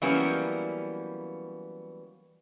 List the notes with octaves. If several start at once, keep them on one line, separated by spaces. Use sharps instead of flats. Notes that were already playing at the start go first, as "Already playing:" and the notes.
E3 F#3 G3 A#3 B3 C#4